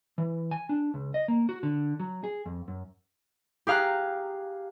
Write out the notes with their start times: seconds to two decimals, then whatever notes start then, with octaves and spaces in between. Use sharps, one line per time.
0.18 E3
0.51 G#5
0.69 D4
0.94 C#2
1.14 D#5
1.28 A#3
1.49 F#4
1.63 D3
2.00 F#3
2.24 G#4
2.46 F2
2.68 F#2
3.67 G4 G#4 F5 A#5 F#6